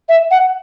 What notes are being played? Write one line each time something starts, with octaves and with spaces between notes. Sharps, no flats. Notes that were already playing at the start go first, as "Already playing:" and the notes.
E5
F#5